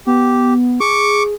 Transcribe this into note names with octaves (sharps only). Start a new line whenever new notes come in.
B3 G4
G#4 C#6 D6